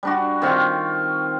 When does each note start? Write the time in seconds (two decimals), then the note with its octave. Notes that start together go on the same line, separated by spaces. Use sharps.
0.03 G3 D4 F#4
0.42 D#3 C4 F4 C#6